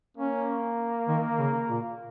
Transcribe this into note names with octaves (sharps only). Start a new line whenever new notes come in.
A#3 C#4
D#3
C#3
A#2